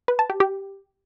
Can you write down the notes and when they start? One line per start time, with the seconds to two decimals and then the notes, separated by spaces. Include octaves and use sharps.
0.08 B4
0.19 A5
0.30 G4
0.40 G4